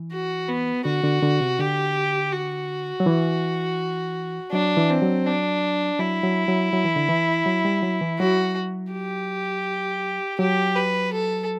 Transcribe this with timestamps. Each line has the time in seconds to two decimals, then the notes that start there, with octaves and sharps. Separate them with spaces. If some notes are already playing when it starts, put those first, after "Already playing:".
Already playing: E3
0.12 F#4
0.48 B3
0.85 D3 F#4
1.04 D3
1.23 D3
1.41 C3
1.59 D3 G4
2.32 F#4
3.00 F#3
3.06 E3
4.52 F#3 D4
4.77 E3
4.90 C4
5.02 F#3
5.26 D4
5.99 F#3 E4
6.24 F#3
6.48 F#3
6.73 F#3
6.85 E3
6.96 D3
7.09 E3
7.46 F#3
7.65 G3
7.82 F#3
8.01 E3
8.19 F#3 F#4
8.93 G4
10.39 F#3 G4
10.76 B4
11.13 A4